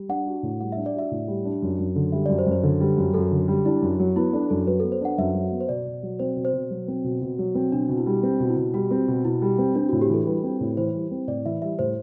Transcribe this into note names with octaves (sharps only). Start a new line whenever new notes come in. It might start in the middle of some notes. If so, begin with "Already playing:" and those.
Already playing: G3
D4 F#5
F#4
A2
G3 F#5
D4 E5
D5
F#4 E5
A2
G3
D4
F#2
F#2
D3
G3 E5
F#2 D5
C5
F#2
C5
D3
G3
F#2
F#2 A4
D3
G3
D4 E4
F#2
F#3
B3 E4
D4 A4
F#2 A4
F#3 B4
B3 A4
C5
D4 F#5
F#2 E5
F#3
B3
C5
B2 D5
B2
F#3
C4 C5
B2
C5
B2
F#3
C4
B2
B2
F#3
C4
B2 D4
B2
E4
G3
C4
B2
E4
B2
G3 F#4
C4
B2
B2 E4
G3
C4
C4 D4
A2 F#4
G4
E3 A4
G3 B4
C4
A2
E3 C5
G3
C4
A2 D5
E3 E5
G3 E5
A2 C5